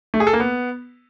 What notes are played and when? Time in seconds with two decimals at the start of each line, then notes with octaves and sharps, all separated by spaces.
0.14 A3
0.20 G#4
0.27 A4
0.33 A#3
0.40 B3